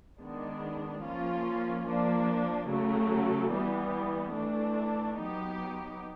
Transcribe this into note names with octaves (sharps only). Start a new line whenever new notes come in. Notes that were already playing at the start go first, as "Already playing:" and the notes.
D#3 G#3 B3 D4
F3 A#3 C#4 F4
F3 A#3 D4
C#3 F#3 A3
E3 G3 B3
E3 A3 D4
F#3 B3 D#4 G4